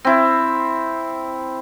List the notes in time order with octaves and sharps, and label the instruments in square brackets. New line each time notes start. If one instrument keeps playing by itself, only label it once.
[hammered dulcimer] C4 E4